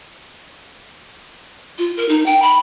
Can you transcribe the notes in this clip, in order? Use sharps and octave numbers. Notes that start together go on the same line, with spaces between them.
F4
A#4
D#4
G5
B5